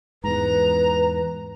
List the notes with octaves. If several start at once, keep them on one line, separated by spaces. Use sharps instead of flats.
E2 G#2 B4 A#5